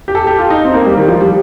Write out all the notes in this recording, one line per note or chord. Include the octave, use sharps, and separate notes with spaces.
G4
A4
G4
F4
D#4
C4
A#3
G3
D#3
F3
G3